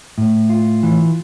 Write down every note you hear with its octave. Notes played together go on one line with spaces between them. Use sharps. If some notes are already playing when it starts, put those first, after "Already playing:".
A2
F4
E3